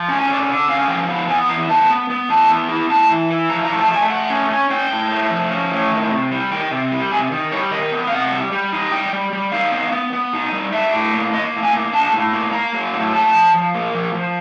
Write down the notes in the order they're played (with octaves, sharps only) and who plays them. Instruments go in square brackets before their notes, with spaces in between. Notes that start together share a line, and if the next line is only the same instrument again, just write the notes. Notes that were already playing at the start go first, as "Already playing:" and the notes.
Already playing: [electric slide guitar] F3
C#4
G#5
D3 D5
D3
C#4 F5
F3 G5
B3
B3 G#5
E3 A#5
B3 A5
B3
B3
E3 A5
B3
E4
E4 A5
E3
E4
F3 A#5
A#5
A3
A5
A3 G#5
A3 F#5
C#4
C#4
C#4 G5
A2
A3
F3
C#4
A2
D#3
C3
G3
D#3 G5
C3
G3
C3 G#5
D#3
G3 C#5
D#3 D#5
B3
F5
C3 F#5
G3
G3
D#4
G3 G5
G3
G3
D#4 F5
B3
B3
B3
D#4
G3
D4 E5
A2
A#3
A#3 D#5
A2
G#5
A#3
D4 A5
A2
A#3
A#3 A#5
F#3
A2
A#3 A5
F3
F3
A#3
F3
F3